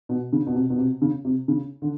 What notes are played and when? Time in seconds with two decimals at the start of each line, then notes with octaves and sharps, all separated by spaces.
0.09 B2
0.33 C#3
0.47 B2
0.55 C3
0.70 B2
0.78 C3
1.02 C#3
1.25 C3
1.48 C#3
1.82 D3